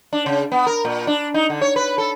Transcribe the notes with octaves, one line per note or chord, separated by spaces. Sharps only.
D4
C#3
B3
A#4
A#2
D4
D#4
D3
C#5
B4
A4